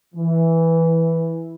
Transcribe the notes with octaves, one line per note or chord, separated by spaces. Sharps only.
E3